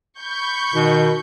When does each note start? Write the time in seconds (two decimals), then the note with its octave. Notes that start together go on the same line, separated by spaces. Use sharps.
0.19 B5 C#6 G6
0.74 B2 D#3